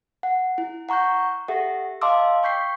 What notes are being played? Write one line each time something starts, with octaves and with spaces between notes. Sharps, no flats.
F#5
E4
F#5 A#5 C#6 F#6 G6
G4 A4 E5 F#5
D#5 F5 A5 C6 D6 E6
G5 C#6 G6 B6 C7